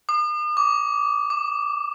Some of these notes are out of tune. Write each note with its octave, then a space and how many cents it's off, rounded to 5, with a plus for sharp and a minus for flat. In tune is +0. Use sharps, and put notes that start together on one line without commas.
D#6 -45
D6 -25
D6 +15